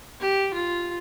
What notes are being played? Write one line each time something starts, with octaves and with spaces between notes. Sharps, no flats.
G4
F4